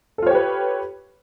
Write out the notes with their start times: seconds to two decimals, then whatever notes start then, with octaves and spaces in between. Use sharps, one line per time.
0.18 A4
0.22 F4
0.27 C#5
0.31 G4
0.35 B4